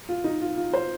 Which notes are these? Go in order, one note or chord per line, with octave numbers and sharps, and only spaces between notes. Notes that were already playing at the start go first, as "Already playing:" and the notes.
F4
D#4
F4
F4
C5